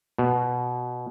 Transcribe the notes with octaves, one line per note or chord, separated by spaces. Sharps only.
B2